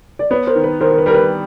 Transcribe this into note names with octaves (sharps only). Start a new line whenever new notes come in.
D5
B3 B4 C#5
A#4 C5
D#3
B4
D#3 A#4 C5
A#4
B4
G3 A#4
B4